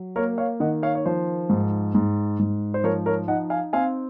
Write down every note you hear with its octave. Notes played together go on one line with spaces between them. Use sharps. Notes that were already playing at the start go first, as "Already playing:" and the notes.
Already playing: F#3
A#3 A#4 C#5
C#5 F5
D#3 D#5 F#5
C#5 F5
C#5
F3 C5
G#2
G#2
G#2
C5
F3 A#4 C#5
A#4 C#5
D#4 D#5 F#5
F5 G#5
C4 F5 G#5